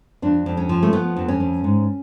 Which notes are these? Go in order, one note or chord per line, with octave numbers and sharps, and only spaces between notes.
F2 D4
F2
C#4
F3
A3
F3 B3
F2
C#4
F2
G#2